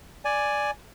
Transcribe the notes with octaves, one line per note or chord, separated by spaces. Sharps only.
D5 G#5